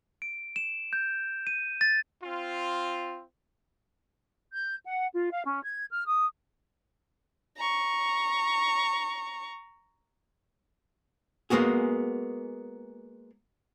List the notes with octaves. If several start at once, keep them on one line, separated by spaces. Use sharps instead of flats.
D7
E7
G6
D#7
A6
C4 F4
G6
F#5
F4
F5
C#4
G#6
F6
D#6
A#5 C#6
G#3 A#3 B3 F#4 G#4